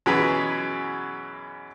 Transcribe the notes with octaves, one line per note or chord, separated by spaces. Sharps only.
F#2 B2 E3 G#4 B4 A#5